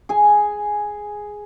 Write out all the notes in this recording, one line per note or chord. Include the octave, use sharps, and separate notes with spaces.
G#4 G#5